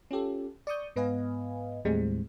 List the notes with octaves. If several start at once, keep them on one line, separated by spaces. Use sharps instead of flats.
C#4 F4 G4 A4
D5 C#6 D#6 G6
G#2 B3 B4 D#5 F5 G#5
D#2 A2 G3 G#3 C4